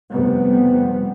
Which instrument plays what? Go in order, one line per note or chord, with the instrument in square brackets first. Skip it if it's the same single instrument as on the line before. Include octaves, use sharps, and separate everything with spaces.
[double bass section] F1 C3 G3 B3